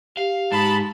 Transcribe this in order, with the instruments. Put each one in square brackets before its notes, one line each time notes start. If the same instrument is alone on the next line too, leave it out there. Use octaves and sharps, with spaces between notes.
[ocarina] G4 [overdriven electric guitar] F5
[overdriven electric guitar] G#2 [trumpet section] A5 B5